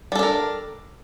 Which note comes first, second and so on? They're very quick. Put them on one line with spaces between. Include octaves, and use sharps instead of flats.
G3 A4 D4 A#4